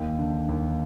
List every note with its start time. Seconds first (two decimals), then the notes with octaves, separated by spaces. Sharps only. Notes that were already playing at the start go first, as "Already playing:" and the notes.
Already playing: D#2 G5
0.19 D3
0.49 D#2